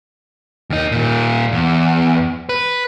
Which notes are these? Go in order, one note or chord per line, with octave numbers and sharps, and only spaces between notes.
D#2 D#4
A#2 D#3
E2
B4